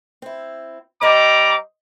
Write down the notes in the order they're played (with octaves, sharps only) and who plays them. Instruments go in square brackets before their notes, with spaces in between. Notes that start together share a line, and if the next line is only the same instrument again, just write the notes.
[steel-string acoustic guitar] C4 E4
[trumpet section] G3 A#5 D6 [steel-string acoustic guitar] C5 D#5